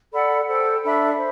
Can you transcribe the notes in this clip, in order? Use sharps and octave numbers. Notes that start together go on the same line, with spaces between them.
A4 D5 F#5 B5
A4 C5 G5
D4 A4 E5 B5
C5